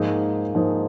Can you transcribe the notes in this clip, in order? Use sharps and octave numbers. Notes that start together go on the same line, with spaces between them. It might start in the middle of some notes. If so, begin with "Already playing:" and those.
Already playing: G#2 F3 A#3 D#4 G#4
G#2 F3 A#3 D#4 G#4